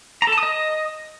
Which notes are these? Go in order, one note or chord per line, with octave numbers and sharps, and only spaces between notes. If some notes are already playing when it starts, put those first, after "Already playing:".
A#5
A4
A5
D#6
D#5